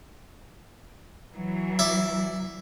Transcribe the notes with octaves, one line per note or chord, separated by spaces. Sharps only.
E3 F#3
E4 D5